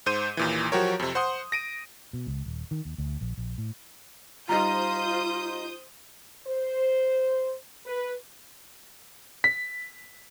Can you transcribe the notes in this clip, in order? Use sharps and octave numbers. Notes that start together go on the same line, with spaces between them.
G#2 C5 G6 D#7
D#2 A#2 E3
F3 F#3 F#4 G4 A#4 C#5
F2 C3
C5 F#5 C6 D#6
A#6 D7 D#7
B2
C#2
D#1
D#3
D#2
D2
A#1
A#1
A2
G3 D#4 F4 C5 A#5 D#6 G6
C5
B4
B6